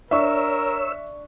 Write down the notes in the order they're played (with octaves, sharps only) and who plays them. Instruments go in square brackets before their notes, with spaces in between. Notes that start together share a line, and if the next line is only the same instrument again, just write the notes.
[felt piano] D4 C#6 [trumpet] A#4 [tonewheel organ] C#5 E6 [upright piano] E5